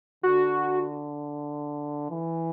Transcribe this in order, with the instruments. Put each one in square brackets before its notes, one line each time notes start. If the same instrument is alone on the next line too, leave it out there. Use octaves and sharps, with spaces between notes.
[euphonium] D3 [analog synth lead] F#4
[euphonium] E3